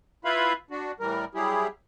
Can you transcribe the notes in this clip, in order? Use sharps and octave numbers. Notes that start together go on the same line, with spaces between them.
E4 F4 B4 E5 F5 B5
D4 F#4
A2 E3 G3 A#4
F#3 G3 E4 G4 G#4